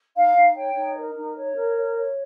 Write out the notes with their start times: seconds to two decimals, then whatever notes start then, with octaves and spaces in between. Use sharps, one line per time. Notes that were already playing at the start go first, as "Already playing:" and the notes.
0.15 D#4 F5
0.35 D#4
0.55 C#5 G5
0.75 D#4
0.95 A#4
1.15 D#4
1.35 C#5
1.55 A#4
1.76 C#5
1.95 C#5